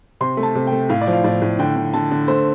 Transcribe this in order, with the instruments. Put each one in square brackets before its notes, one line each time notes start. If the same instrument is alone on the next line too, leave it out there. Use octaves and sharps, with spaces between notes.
[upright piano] C3 C6
A3
A5
C3
A3 G5
A2 F5
D5
F3
F5
A2 D5
A2
D3 G5
D3
D3 A5
D3
A3 C5